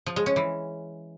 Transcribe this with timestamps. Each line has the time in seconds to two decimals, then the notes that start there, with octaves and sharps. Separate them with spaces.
0.06 F3
0.16 G#3
0.26 C#4
0.36 E3